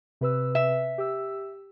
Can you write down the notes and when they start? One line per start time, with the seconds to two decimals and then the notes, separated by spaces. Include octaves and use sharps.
0.21 C3 B4 E6
0.55 E5
0.98 G4 E6